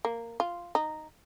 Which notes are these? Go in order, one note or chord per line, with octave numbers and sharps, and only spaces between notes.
A#3
F4
D#4